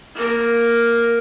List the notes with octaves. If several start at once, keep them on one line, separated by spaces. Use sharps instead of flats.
A#3 A#4